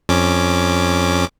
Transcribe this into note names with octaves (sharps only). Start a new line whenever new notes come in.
F2 C#4 D6